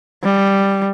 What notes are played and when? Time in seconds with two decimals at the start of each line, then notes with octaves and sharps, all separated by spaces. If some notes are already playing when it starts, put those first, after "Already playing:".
0.24 G3